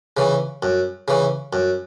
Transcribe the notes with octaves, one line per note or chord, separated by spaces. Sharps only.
C#3 E3
F#2
C#3 E3
F#2